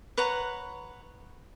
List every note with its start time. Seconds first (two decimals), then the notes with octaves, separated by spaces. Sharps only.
0.17 B4 C#5 F#5 A#5